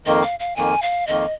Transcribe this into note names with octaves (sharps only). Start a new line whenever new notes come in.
F2 D#3 A#3 D#5
F5
F5
F2 D#3 A#3 G#5
F5
F2 D#3 A#3 D#5